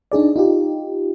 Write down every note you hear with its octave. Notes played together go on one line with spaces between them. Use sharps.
D4 D#4 G#4 D5
D#4 F4 G4